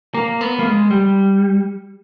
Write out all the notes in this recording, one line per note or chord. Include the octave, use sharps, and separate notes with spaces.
A#3
B3
A#3
G#3
G3